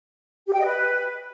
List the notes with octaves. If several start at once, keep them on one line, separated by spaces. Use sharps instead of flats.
G4
G5
D#5
B4